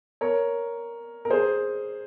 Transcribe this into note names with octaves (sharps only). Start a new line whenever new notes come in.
A#4 C#5
A#4
G#4 C5